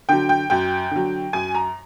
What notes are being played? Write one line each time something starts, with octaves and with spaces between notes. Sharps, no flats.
D3 F#3 G5
G5
F#2 G5
D3 F#3
F#2 G#5
A#5